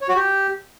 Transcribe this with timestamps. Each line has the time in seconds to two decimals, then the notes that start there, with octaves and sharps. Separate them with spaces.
0.01 C#5
0.08 F#4
0.16 G4